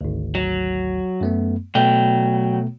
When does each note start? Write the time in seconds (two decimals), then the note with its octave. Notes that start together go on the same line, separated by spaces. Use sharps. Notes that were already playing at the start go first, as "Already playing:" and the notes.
0.01 G#1 D2
0.35 F#3
1.21 F#2 A3 B3
1.75 B2 F#3 A3 B3 G5